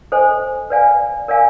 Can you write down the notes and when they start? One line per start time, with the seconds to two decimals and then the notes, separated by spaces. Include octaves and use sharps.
0.12 A4 C5 D#5 G#5
0.70 B4 D5 F5 G#5
1.28 A#4 D5 F5 G#5